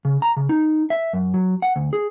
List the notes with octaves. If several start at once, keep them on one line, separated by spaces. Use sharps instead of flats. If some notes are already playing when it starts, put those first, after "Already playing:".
C#3
A#5
C#3
D#4
E5
F#2
F#3
F#5
D2
G#4